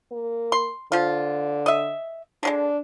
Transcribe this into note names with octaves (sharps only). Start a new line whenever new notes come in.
A#3
C6
D3 F3 F4
D#5 E5
D3 F#3 G#3 D4